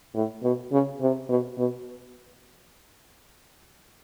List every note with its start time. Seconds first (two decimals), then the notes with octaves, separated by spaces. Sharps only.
0.15 A2
0.43 B2
0.72 C#3
1.01 C3
1.29 B2
1.58 B2